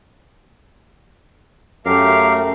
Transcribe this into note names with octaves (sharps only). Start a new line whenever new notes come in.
F#2 A3 G4 A#4 F5